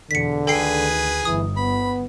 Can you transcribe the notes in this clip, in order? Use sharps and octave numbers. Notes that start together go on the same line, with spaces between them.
E2 B2 D3 B6 C#7
D2 D#3 G#4 A4 B4 G5 G#5 C7
G1 E3 D#6
B3 B5